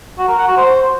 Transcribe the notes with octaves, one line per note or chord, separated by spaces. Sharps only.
F#4
A#4
F#5
F#4
C5